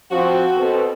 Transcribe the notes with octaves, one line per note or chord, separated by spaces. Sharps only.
F3 C4 F#4
B2 C4 A4